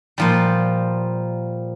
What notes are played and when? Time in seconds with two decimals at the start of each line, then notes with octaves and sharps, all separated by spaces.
0.18 A#2 F3 G3